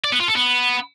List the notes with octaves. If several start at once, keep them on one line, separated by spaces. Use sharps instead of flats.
D5
B3
F4
A4
B3